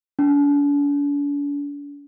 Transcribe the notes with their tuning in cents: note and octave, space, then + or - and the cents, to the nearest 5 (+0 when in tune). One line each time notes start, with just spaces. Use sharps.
D4 -45